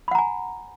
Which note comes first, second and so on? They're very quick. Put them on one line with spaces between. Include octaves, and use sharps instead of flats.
B5 F#5 A#5 G#5